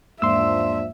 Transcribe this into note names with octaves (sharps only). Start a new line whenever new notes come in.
E2 G#2 F3 A#3 D4 E5 C6 E6